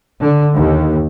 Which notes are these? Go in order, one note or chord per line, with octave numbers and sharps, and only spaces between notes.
D3
D#2